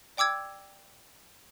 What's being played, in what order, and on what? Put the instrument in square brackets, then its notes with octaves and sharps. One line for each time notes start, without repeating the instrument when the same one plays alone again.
[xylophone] D5 G5 D6 E6 G#6